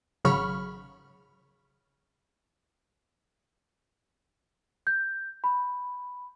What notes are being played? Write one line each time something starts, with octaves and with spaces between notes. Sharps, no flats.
G#1 C#3 F#3 B5 C#6 F6
G6
B5